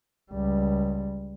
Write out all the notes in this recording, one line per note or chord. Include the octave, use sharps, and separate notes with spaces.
C#2 G3